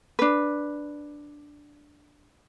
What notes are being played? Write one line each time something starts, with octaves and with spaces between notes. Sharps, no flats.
D4 B4